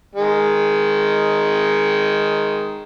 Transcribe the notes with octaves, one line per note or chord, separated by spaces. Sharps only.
D#3 G#3